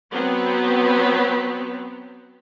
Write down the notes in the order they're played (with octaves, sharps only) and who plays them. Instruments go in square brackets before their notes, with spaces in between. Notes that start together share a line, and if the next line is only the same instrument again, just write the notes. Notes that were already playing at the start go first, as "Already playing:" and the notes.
[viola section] F#3 B3 C4